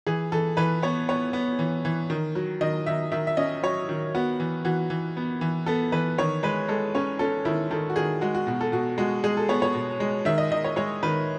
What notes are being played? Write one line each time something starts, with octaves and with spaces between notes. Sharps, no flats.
E3 G#4
E3 A4
E3 B4
B3 C#5
B3 C#5
B3
E3
E3
D#3
F#3
D#3 D#5
D#3 E5
D#3 E5
E5
C#4 D#5
F#3 C#5
D#3
B3 F#4
E3
E3 F#4
E3
B3
E3
B3 A4
E3 B4
D#3 C#5
G#3 B4
G#3 A4
C#4 C#5
C#4 A4
D#3 E4
D#3 A4
F#4
D#3 G#4
G#3 F#4
F#4
B2 F#4
A4
B2 F#4
G#3 F#4
G#3 G#4
A4
B3 C#5
C#5
B2
G#3
D#3 E5
D#5
D#3 D#5
C#5
G#3 C#5
D#3 B4